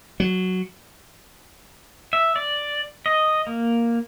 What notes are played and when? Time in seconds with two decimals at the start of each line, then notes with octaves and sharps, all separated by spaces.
0.20 F#3
2.13 E5
2.36 D5
3.06 D#5
3.47 A#3